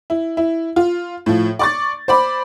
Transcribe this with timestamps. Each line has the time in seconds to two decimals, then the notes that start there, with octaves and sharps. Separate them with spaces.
0.10 E4
0.37 E4
0.76 F4
1.26 A2 F3
1.59 D5 C#6 A6
2.08 C5 D5 B5